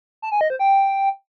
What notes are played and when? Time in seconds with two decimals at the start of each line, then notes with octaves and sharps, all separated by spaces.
0.22 A5
0.32 G#5
0.41 D#5
0.50 C5
0.59 G5